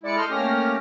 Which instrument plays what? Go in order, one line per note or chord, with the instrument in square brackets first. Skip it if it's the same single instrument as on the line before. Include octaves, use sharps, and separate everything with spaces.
[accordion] G#3 E4 [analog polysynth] D5 C#7
[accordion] A4 D#5 F6 [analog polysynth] C6 G6
[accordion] A3 C#4 G4 [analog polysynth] A#3 F6 A#6